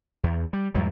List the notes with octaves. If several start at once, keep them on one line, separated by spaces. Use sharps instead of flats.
E2
G3
E2 G#2 F#3 G3